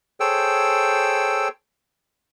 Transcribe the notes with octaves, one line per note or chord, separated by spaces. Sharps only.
G#4 A4 C5 C#5 G5 E6